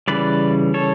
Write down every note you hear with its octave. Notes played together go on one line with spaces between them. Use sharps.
C#3 E3 G3 B4 D5
A4 C#5